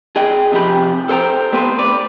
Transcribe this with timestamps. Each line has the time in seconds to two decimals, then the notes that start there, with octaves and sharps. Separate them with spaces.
0.16 G#4 D#5 G5
0.52 C3 F3 G4 B5
1.09 A4 C5 G5 A#5
1.52 G3 A3 B3 C4 B4 C5
1.78 B4 D5